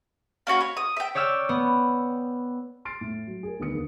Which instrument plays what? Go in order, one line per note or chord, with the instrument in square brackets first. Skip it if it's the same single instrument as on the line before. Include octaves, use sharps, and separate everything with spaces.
[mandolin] A#3 C#4 F#4 B5
C#5
D#6
E5 G5
[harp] C#5 D5 G5 E6 F6
B3
[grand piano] C6 F6 A6 C7 D7
A2
F#3
G#4 A#4
D2 D#3 B3 D#4 D#6 C#7
D#2 D3 A#3